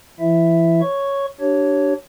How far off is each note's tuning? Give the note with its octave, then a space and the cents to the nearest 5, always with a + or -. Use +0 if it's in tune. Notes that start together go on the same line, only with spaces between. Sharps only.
E3 +30 E4 +15 E5 +0
C#5 +0 C#6 +0
D4 +0 G4 -30 C#5 +0